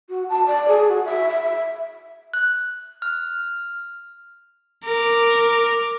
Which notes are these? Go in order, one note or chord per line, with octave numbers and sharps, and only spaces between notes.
F#4
A5
D5
G#4
F#4
E5
E5
E5
F#6
F6
A#4 D6